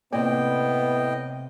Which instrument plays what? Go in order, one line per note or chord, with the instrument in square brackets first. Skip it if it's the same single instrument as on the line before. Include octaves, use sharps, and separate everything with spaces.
[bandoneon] A2 D#5 G5 [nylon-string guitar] C3 D5 [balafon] A#3 [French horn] B3